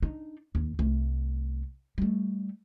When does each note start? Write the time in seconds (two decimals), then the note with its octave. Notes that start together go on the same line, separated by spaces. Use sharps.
0.03 D4 D#4
0.55 D#2
0.79 C2 A3
1.98 G3 A3